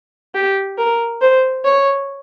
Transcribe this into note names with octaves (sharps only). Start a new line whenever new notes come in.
G4
A#4
C5
C#5